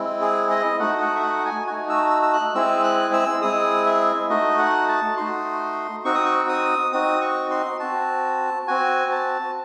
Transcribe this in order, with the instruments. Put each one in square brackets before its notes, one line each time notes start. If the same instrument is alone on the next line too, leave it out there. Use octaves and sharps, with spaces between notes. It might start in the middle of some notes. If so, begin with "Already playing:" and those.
Already playing: [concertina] G#3 C4 E4
G#4
D#5
A3 D#4 F#4 F#5
F#5
E5
F#5
G#5
A3 D#4 F#4 G#5
E6
E6
E6
F#6
G#3 C4 E4 G#4 E6
F#6
E6
G#3 C4 E4 G#4 D#6
E5
A3 D#4 F#4 D#5
F#5
A5
A3 D#4 F#4 C6
C4 D#4 F#4 C#6
D#6
C#6
D#6
C4 D#4 F#4 D#6
C#6
C6
C4 F#4 A5
C4 F#4 G#5
A5